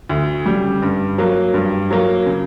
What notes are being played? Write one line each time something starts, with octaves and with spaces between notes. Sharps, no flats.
D2
C#3 G3
G2
F#3 A#3
G2
F#3 A#3
C#3